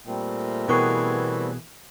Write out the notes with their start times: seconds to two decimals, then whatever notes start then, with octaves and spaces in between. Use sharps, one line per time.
0.06 A#2 G3 A3 C4
0.68 B2 E3 B3 G#4 A#4 C#6 G#6